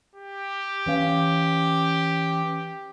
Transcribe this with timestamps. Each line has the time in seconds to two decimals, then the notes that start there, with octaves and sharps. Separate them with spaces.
0.15 G4
0.86 E3 C#4 F5